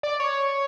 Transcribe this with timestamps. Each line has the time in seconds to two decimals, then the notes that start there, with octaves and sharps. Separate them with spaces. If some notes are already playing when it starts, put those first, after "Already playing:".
0.03 D5
0.20 C#5